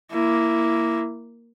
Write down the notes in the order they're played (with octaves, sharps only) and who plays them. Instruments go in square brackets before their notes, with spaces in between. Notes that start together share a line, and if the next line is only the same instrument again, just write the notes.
[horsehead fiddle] A#3 E4